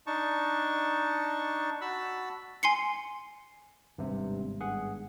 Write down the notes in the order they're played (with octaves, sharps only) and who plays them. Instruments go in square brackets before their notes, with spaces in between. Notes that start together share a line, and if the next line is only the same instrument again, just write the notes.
[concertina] D4 D#4 A5 C#6
F#4 A5 B5 E6
[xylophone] G#5 C6 C7 C#7
[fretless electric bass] G#1 G3 B3 [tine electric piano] G2 C3
[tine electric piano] G2 G#4 F#5